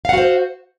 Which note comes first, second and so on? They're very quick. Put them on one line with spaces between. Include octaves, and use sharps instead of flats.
F5 F#5 F#4 C5